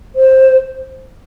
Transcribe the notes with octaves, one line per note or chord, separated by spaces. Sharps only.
C5